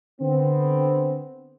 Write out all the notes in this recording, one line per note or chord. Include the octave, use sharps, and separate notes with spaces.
D3 B3 C4